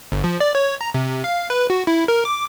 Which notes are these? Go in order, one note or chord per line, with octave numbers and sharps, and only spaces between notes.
G1
F3
D5
C#5
A#5
C3
F5
B4
F#4
E4
A#4
D6